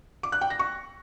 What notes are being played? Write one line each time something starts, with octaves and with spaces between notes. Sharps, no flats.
D6
F#6
G5
A#6
C#6